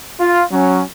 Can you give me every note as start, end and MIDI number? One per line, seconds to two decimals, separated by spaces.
0.20 0.43 65
0.51 0.81 54
0.51 0.81 61